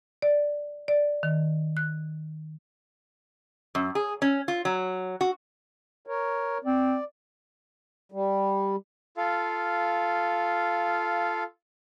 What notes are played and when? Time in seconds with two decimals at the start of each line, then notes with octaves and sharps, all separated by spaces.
0.22 D5
0.88 D5
1.23 D#3
1.77 F#6
3.75 F#2
3.95 G#4
4.22 C#4
4.48 F4
4.65 F#3
5.21 F#4
6.07 A#4 C#5
6.65 C4 D5
8.12 G3
9.17 F4 A4 F5